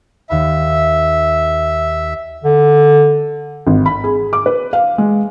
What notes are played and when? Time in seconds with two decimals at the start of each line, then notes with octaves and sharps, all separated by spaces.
0.30 D#2 E5 F5 B5
2.44 D3
3.67 G#1
3.86 B5
4.04 G#4
4.33 D6
4.46 B4
4.73 F5
4.98 G#3